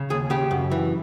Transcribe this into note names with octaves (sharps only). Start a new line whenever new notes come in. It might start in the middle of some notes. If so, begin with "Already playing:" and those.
Already playing: C#3
D#2 G#4
C#3 G4
F#2
E3